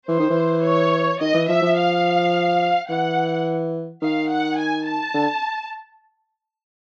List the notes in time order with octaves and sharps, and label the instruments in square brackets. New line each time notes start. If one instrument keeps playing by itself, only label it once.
[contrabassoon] E3 [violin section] C5
[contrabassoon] D#3
E3
[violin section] C#5
[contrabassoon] D#3 [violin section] D#5
[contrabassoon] E3
[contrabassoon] F3 [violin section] E5
[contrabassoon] F3
[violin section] F5
[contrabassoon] E3 [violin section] F#5
[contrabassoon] D#3 [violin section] F5
[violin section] F#5
G#5
A5
[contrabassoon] D3